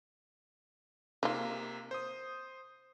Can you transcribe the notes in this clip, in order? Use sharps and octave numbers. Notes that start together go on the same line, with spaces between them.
C3 A#3 D#4 F4
C5 D#6